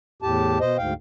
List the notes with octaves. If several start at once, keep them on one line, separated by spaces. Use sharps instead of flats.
E2 A2 G4 A5
B2 C5 D#5
D2 G#2 F5 G5